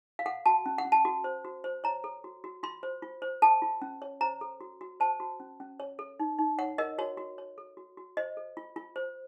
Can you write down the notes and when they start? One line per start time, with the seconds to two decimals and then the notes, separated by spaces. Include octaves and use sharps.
0.19 F5
0.26 A4 F#5
0.46 F#4 A5
0.66 C#4
0.78 F#5
0.85 C#4
0.92 A5
1.05 F#4
1.24 C5
1.45 F#4
1.64 C5
1.84 C#5 A#5
2.04 A4
2.24 F#4
2.44 F#4
2.63 F4 C6
2.83 C5
3.02 F4
3.22 C5
3.42 A4 A5
3.62 F4
3.82 C#4
4.02 C#5
4.21 C5 A#5
4.41 A4
4.61 F#4
4.81 F#4
5.00 C5 A5
5.20 F#4
5.40 C#4
5.60 C#4
5.80 C#5
5.99 A4
6.20 D#4
6.39 D#4
6.59 C#5 F#5
6.78 A#4 D#5
6.98 F#4 C#5
7.17 F#4
7.38 C#5
7.58 A4
7.77 F#4
7.97 F#4
8.17 C5 D#5
8.37 A4
8.57 F4
8.76 F4
8.96 C5